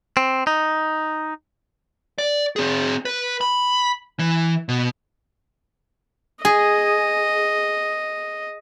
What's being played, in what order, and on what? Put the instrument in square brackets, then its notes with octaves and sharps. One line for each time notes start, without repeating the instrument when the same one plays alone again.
[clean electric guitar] C4
D#4
[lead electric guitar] D5
C4 G#4
B4
B5
E3
B2
[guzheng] G#4 [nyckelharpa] D#5